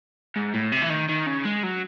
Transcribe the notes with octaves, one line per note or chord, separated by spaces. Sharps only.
G#2
A2
C3
E3
D#3
D#3
C#3
G#3
F#3